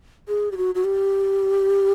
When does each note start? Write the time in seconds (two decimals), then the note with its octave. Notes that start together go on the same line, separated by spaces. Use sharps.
0.28 G#4
0.52 G4
0.57 F#4
0.75 F#4
0.84 G4